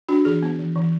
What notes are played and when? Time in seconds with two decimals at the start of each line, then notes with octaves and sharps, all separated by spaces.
0.09 D4 F#4
0.25 E3 G#4
0.43 B3
0.59 E3
0.76 E3